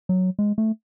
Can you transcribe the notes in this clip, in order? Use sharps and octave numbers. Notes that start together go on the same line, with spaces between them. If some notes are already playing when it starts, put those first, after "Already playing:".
F#3
G#3
A3